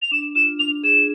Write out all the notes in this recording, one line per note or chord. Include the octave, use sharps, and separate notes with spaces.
F7
D4 E7
F4 E7
D4 F7
G#4 E7